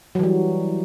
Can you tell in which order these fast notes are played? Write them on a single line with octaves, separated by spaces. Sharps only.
F#3 E3 G3